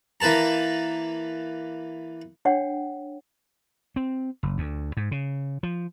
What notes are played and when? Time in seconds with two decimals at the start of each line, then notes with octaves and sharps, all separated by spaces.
0.20 E3 A#3 B4 A5 A#5
2.45 D4 C#5 F#5 G5
3.96 C4
4.43 F#1
4.58 D2
4.97 G#2
5.11 C#3
5.63 F3